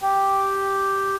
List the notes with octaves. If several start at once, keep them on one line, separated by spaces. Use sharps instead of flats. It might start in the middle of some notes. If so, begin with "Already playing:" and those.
G4